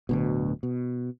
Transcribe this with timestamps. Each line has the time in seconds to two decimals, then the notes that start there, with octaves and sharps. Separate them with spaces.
0.09 D1 D2 B2
0.63 B2